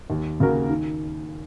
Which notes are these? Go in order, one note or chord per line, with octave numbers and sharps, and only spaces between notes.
D#2
C#3 A#3 F#4 A#4
D#3